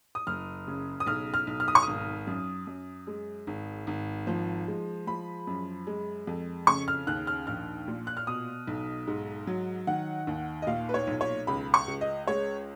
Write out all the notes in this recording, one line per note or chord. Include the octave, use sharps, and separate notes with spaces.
D#6
F#1 F6
C#3
D#6
B1 F6
F6
B1
F6
D#6
C#6
G#1 D#6
F#2
F#2
G#3
G#1
G#1
F3
G#3
F3 B5
F#2
G#3
F2
C#3 C#6
F6
D#2 F#6
F6
A#1 F6
A#2
F#6
F6
B2 D#6
B1
G#2
F#3
D#3 F#5
D#2
D#5
A#2 F5
B4
C#5
B1
C#5
C#2 B5
C#6
C#2
D#5
G#3 C#5